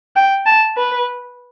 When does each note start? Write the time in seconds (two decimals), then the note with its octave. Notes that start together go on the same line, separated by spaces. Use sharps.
0.16 G5
0.46 A5
0.77 B4